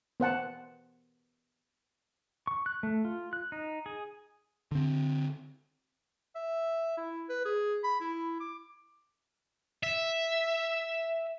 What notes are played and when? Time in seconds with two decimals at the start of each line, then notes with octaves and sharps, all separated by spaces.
0.20 B3 C5 F#5 A5
2.47 C#6
2.66 F#6
2.83 A3
3.05 F4
3.33 F#6
3.52 D#4
3.86 G#4
4.72 D3 C4
6.35 E5
6.97 E4
7.29 B4
7.45 G#4
7.84 B5
8.01 E4
8.40 D6
9.83 E5